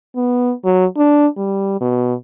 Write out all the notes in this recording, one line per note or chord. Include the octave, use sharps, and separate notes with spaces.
B3
F#3
D4
G3
B2